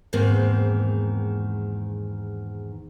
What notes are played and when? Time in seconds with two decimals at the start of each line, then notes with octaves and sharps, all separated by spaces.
0.13 E2 G#2 D#3 A#3 C4